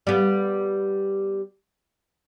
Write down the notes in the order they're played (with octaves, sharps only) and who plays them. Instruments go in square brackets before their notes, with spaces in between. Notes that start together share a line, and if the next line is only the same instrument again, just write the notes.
[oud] G3 B3